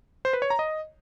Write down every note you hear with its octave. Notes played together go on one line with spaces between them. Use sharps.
C5
B4
C#5
A#5
D#5